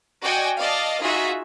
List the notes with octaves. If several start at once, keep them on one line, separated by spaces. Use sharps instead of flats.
F#4 D5 D#5 G5 G#5
D5 D#5 F5 A5
D#4 F4 F#4 G#4 E5